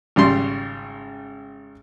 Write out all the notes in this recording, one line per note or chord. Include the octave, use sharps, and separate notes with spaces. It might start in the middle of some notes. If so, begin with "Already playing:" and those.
G#1 C#3 G3 C6